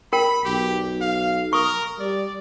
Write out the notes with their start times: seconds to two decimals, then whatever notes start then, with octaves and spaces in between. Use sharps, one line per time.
0.13 A#4 G5 B5
0.45 B1 G4
1.01 F5
1.53 A#4 C#6 D#6
2.00 G3 D5